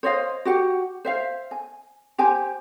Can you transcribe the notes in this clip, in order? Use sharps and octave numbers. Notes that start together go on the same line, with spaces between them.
C5 C#5 D#5 F5
F#4 G4 F#5
C5 E5 F5
G#5
G4 C5 G#5